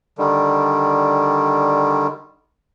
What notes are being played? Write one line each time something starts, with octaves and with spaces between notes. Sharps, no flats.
D3 D#3 G3